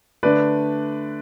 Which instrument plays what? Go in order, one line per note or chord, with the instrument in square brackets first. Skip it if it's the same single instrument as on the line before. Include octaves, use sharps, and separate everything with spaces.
[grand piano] D3 A3 D4 B4 D5